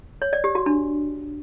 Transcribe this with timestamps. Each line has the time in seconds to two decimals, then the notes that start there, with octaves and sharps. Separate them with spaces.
0.22 C#5
0.33 D5
0.44 G4
0.55 F#4
0.66 D4